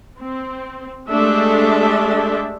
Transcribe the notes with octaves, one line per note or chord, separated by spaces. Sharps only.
C4
G#3 A3 D4 G4 A4 E5